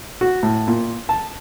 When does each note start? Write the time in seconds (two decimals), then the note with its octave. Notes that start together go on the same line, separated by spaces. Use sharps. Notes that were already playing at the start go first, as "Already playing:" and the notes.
0.21 F#4
0.43 A2
0.68 A#2
1.09 A5